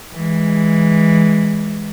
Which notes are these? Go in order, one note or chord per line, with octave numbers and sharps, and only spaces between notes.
E3 G#3